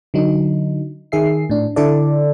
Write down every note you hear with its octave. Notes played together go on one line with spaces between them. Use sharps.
D3 F#3 D#4
D#3 G#4 E5 C7
A2 D4
D3 E4 A4 D5